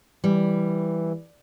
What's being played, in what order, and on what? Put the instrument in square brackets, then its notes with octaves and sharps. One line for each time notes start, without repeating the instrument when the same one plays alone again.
[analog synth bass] E3 [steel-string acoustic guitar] G3